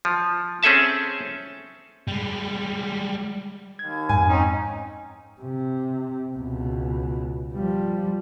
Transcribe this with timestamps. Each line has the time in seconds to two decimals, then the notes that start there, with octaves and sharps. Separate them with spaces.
0.05 F3
0.63 C4 C#4 G#4 A4 E5 A5
2.08 G3 G#3
3.79 D#2 G#6
4.09 F2 G#2 G#5
4.28 C4 C#4 D#4
5.41 C3
6.36 C#2 B2
7.53 F3 G3